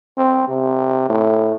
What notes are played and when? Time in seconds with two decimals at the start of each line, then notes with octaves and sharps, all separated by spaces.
0.17 C4
0.48 C3
1.09 A2